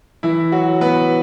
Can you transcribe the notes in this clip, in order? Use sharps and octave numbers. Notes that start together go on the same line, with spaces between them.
E3 E4
F#3 F#4
B3 B4